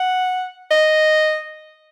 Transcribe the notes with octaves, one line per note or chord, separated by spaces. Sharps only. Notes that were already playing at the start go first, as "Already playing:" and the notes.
Already playing: F#5
D#5